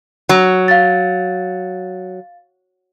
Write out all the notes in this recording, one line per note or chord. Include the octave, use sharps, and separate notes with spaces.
F#3
F5 A6